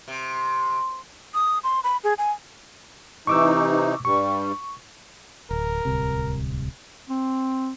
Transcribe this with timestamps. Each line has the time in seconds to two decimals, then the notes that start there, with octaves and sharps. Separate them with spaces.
0.08 C3
1.34 D#6
1.64 C6
1.84 B5
2.04 G#4
2.18 G#5
3.27 C3 E3 D#4 C#6 D6 E6
4.05 G2 G3 C#6
5.51 D1 A#4
5.85 D1 C2 C3
7.09 C4